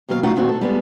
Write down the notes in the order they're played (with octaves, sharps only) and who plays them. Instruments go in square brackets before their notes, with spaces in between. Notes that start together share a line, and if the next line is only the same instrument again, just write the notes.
[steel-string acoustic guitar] D#2 B2 F#3 A#4 F5
A3 D#4 F4 F#4 F#5
A#2 D#3 C4 F#4
A4
G3 G#3 B3